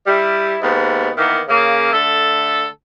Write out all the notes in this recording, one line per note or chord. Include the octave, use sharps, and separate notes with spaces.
G3 E4
D#2 G#2 B3
D#3 E3 A#3 B3
C#3 A#3
D3 A3 A4